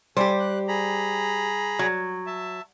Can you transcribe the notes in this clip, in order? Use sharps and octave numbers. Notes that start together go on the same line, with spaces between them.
G3 G4 A4 C5 G#5
F#6
G#4 A#5 B5
F#3
E5 A5